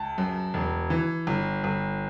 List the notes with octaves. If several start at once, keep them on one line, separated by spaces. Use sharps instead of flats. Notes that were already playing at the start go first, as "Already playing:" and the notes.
Already playing: C#2 A5
F#2
E1
E3
G1
G1